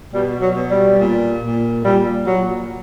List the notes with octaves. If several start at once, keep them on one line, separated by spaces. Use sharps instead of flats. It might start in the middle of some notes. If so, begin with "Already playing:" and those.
B2 G3
F#3
B2
G3
A#2
A#2
A#2 G3
A#2 F#3